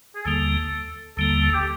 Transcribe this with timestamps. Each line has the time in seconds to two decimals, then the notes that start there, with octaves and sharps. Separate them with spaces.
0.15 G#4
0.25 D#2 D3 G3 A#3 A4
1.17 D#2 D3 G3 A#3 A4
1.41 A4
1.54 G4